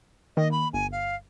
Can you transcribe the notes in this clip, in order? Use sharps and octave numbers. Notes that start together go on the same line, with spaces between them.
D#3 A#3 D#5
B5
G1 G#5
F5